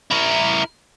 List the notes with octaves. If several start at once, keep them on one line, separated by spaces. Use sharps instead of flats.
E4 A#4